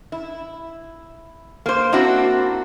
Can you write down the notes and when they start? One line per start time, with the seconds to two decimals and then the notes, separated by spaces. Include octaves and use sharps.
0.12 E4
1.66 A#3 C5
1.92 A#3 C4 D4 E4 F#4